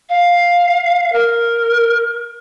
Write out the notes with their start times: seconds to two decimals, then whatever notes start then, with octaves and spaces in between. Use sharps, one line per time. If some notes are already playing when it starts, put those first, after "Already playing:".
0.09 F5
1.13 A#4